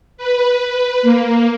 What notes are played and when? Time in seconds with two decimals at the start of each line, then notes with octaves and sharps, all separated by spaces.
0.17 B4
1.02 A#3